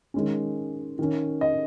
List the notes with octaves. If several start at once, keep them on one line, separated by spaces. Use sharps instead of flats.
D#3 G#3 C#4
D#3 C#4
D#5